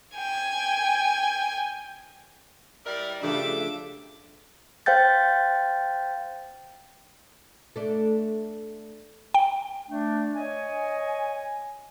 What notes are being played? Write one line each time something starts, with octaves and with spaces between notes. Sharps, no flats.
G5 G#5
G3 E4 A#4 D5
G2 C#3 F3 A3 D4 E5 D6
C5 F5 G5 G6 A6
A3 D4
G5
A3 D4
C#5 D#5 G#5